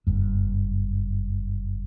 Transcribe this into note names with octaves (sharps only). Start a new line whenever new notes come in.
F#1 G2